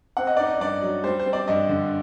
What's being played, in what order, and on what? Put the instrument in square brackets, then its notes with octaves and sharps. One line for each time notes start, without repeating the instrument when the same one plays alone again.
[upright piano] C4 F#5
D#5
D#4 D5
D#5
G2 D5
F#3
G3 C5
C5
C4
D5
G2 D#5
D3